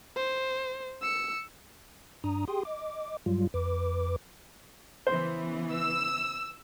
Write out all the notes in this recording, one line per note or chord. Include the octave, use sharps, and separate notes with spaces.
C5
E6 C#7
G2 D4 A#5 D#6
G4 G#4 G5 C6 D#6
D#5 D6
G2 F#3 G3 F4
F2 B4 D6
C#3 E3 B3 C5
E6